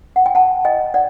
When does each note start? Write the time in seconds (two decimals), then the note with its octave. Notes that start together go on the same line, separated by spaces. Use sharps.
0.16 F#5
0.26 G5
0.35 F#5 A5
0.65 D#5 G5
0.94 D5 F#5